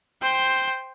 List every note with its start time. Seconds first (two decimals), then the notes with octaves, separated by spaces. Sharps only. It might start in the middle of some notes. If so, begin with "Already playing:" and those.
0.22 C5 G5